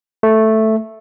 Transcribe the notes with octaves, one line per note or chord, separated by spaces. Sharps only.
A3